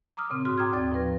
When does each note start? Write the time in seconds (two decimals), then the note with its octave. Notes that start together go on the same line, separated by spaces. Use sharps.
0.17 A#5 D6 D#6 F6
0.30 A#2 C#3 C4
0.45 G#2 F#4 C6 F6
0.58 G5 A#5 D6 D#6 F6 G#6
0.73 D#2 C4 D5 G5 A6
0.92 A2 F3 B4 A#6